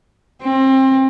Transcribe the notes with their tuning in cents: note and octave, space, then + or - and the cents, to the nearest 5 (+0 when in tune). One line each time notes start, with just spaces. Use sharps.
C4 +25